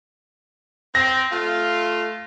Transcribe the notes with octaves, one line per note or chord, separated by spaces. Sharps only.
C4 A#6
A3 F4